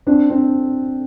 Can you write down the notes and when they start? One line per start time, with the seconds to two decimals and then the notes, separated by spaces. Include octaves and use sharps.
0.07 C4 D4
0.30 C4 D4